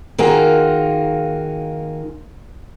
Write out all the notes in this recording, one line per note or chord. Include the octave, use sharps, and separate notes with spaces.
D#3 A#3 D#4 F4 F#4 G#4